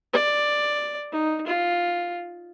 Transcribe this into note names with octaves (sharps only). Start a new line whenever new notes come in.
D5
D#4
F4